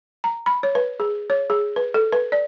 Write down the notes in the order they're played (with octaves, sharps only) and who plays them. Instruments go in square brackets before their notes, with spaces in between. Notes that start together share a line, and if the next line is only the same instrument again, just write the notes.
[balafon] A#5
B5
C#5
B4
G#4
C#5
G#4
B4
A4
B4
D5